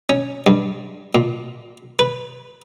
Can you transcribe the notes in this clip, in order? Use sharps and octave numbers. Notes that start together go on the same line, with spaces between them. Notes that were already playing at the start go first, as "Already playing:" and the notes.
C#4
G2
A#2
B4